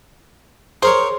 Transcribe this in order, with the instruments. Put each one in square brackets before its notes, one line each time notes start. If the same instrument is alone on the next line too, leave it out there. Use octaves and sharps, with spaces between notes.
[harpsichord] G#4 A#4 C#5 [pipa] C5